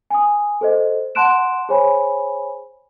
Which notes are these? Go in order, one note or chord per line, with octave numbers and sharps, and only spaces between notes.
G#5 D#6
A4 C5 D#5
F#5 A5 C6 F#6 D7 E7
G#4 C5 C#5 G#5 B5